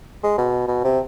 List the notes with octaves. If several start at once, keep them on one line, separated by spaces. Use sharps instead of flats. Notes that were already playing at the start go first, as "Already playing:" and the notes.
G#3
B2
B2
C3